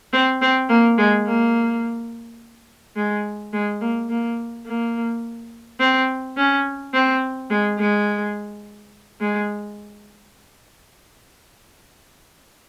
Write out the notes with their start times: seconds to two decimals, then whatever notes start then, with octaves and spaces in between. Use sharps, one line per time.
0.13 C4
0.41 C4
0.69 A#3
0.98 G#3
1.26 A#3
2.96 G#3
3.53 G#3
3.81 A#3
4.09 A#3
4.66 A#3
5.80 C4
6.37 C#4
6.94 C4
7.50 G#3
7.79 G#3
9.20 G#3